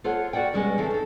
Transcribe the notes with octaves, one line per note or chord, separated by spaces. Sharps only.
F4 A4 C5 C#5 F#5
F#4 A#4 D5 F#5 G5
B2 D3 G3 G#3 B3 C#4
C#3 E3 C4 E4 A4
D#4 A4